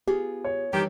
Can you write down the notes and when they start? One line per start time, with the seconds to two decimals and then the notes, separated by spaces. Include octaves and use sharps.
0.07 B3 F4 G4 G#4
0.44 C#5
0.73 D#3 E3 G3 D4 G4